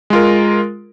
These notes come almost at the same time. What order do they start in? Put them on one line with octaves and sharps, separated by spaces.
G#3 F4 A#4